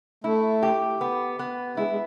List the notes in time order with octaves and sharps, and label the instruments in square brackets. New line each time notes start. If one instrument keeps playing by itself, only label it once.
[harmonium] A3 [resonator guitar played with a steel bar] E4
[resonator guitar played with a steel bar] G4
B3
B3
[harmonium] G#3 [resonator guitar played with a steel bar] E4
[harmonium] G#3